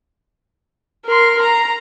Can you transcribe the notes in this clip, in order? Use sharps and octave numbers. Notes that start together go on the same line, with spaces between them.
A#4 C6
A#5